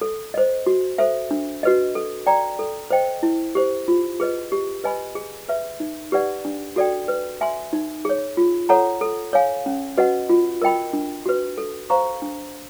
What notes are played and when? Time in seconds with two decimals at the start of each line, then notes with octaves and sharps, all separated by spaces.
0.01 A4
0.34 C5 D#5
0.66 F#4
0.98 A4 C5 E5
1.31 D4
1.63 F#4 B4 D#5
1.95 A4
2.27 D5 G5 A#5
2.59 A4
2.91 C5 D#5 G5
3.23 E4
3.55 G4 C5
3.88 F4
4.20 G#4 B4 D#5
4.52 G4
4.84 B4 D#5 G#5 B5
5.15 G#4
5.49 B4 E5
5.80 D#4
6.12 G4 B4 D5 F#5
6.45 D4
6.76 F#4 A4 D5 G5
7.08 B4
7.41 E5 G#5 C6
7.73 D#4
8.05 G#4 C#5
8.37 F4
8.69 A4 C#5 F#5 A#5
9.01 A4
9.33 C#5 F5 G#5
9.66 C#4
9.97 F#4 B4 D#5 F#5
10.29 F4
10.62 A#4 D#5 G5 B5
10.93 D4
11.26 F#4 B4
11.58 A4
11.90 C5 F5 A#5 C#6
12.22 D4